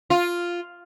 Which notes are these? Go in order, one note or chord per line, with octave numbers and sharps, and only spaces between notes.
F4